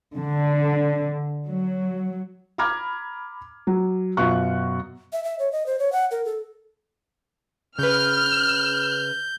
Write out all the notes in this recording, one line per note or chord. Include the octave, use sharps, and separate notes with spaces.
D3
F#3
A#5 B5 D6 F6 G#6
F#3
F#2 B2 F4 F#4 C#6 F#6
E5
E5
C#5
D#5
C5
C#5
F#5
A#4
A4
C#3 B4 F6 G6